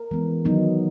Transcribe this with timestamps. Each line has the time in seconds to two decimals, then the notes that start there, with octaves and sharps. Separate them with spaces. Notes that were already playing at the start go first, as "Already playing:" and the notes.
Already playing: A#4
0.11 E3 G#3 B3
0.45 D#3 F#3 B3 D#4